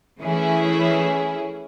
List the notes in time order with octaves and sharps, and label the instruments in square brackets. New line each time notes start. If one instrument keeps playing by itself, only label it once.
[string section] E3 A3 C#4 E4 G#4